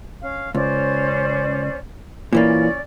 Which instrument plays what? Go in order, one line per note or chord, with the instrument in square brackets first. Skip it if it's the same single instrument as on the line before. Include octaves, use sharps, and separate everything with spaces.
[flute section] C#4 F5
[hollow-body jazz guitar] C#2 [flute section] C#4 C5 D5
[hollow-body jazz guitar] A#2 E3 A#3 [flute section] C#4 D5